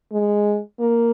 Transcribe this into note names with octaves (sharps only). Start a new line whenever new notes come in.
G#3
A#3